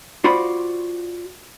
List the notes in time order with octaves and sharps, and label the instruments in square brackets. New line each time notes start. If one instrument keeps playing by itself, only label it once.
[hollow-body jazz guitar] F4 F#4 C5 D5 B5